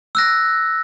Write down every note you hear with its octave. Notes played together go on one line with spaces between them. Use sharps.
E6 F#6 A#6